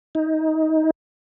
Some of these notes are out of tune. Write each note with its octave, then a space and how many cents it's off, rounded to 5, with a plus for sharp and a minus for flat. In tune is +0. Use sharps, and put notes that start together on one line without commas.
D#4 +20